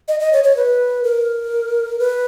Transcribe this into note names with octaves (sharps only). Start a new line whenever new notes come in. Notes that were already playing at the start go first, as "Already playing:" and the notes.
D#5
D#5
C#5
C#5
B4
A#4
B4